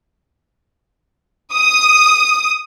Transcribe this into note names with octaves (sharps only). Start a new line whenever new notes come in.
D#6